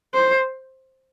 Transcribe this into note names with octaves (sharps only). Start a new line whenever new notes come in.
C5